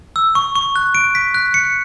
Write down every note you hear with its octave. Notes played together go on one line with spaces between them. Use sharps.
E6
C#6
C#6
F#6
D7
B6
F#6
C#7